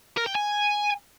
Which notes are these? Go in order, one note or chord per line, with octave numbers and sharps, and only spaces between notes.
A#4
G5
G#5